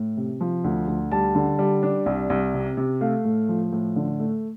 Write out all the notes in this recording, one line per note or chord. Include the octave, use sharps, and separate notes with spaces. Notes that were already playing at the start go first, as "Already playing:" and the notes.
Already playing: A2
C3
F3
D2
D2
G3 A5
D3
G3
D4
C2
C2
C3
C3
A3 F5
A2
F3
A2
D3
A3